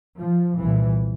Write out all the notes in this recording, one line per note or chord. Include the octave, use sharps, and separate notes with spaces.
F3
C2 A#2 E3